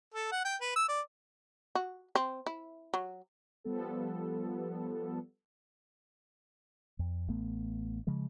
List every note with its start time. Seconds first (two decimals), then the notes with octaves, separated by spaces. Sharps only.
0.14 A4
0.32 F#5
0.45 G5
0.61 B4
0.76 E6
0.88 D5
1.75 F#4
2.15 C4
2.46 E4
2.94 F#3
3.64 F3 G3 B3 A4
6.99 F2
7.28 A1 A3 B3
8.07 C#3 F3 G#3